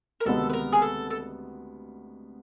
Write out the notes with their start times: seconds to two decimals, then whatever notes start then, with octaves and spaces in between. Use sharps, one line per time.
0.20 A#4
0.25 D2 C3 D#3 G#3 B3 A4
0.50 B4
0.53 A#4
0.73 G#4
0.82 A4
1.10 A4